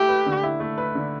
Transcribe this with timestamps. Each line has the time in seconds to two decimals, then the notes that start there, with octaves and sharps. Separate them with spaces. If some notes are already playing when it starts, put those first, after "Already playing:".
Already playing: A3 E4 G4
0.09 B4
0.26 D3
0.43 E4
0.60 A3
0.78 B4
0.95 D3